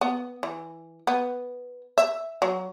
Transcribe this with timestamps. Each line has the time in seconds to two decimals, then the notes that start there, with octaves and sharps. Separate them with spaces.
0.01 B3
0.43 E3
1.07 B3
1.98 E5
2.42 F#3